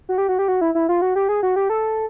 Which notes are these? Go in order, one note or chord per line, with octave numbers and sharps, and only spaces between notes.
F#4
G4
F#4
G4
F#4
E4
E4
F4
F#4
G4
G#4
F#4
G4
A4